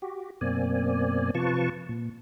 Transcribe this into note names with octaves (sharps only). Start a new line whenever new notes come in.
F#4 G4
F#2 B2 A#3 C4 D5 G#5
C3 F3 F4 B4 A5 C#6
A#2